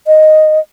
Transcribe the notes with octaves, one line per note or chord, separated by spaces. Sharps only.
D#5